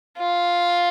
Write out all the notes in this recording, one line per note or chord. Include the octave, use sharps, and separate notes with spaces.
F4